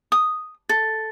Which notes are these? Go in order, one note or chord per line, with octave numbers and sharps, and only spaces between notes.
D#6
A4